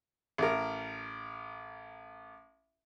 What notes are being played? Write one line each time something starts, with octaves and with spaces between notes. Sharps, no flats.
A1 A#4